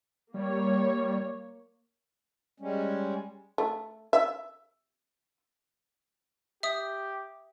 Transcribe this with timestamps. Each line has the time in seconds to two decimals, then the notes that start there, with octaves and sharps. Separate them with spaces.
0.34 G3 A#3 C#5
2.60 G3 G#3 C#4
3.58 A3
4.13 E5
6.63 G4 E5 D#6